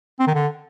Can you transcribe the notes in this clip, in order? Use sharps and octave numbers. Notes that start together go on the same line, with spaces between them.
C4
D#3
D3